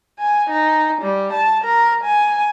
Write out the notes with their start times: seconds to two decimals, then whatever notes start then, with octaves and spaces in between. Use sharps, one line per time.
0.19 G#5
0.50 D#4
1.02 G3
1.33 A5
1.64 A#4
2.04 G#5